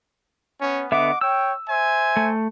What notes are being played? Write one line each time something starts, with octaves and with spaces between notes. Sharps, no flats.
B3 C#4
D3 B3 D#5 E5 F#5 D6
C#5 G5 E6
C5 E5 G#5
A3